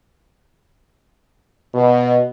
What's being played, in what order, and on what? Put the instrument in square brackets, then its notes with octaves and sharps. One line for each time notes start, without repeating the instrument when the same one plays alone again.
[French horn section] B2